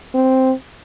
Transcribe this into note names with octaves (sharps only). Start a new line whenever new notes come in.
C4